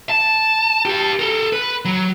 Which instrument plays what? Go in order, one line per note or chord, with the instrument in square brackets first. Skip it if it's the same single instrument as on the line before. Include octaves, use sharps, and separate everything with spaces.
[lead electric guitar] A5
G4 A5
A4 A#4
B4
F#3